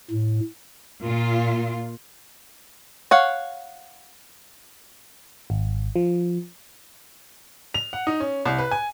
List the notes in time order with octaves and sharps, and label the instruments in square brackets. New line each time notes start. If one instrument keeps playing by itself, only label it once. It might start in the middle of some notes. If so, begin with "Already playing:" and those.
[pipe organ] A2
[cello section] A#2 F4
[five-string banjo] C#5 F5 F#5
[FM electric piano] G#1
F3
[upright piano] F7
F#5
D#4
C#4
C2
B4
G#5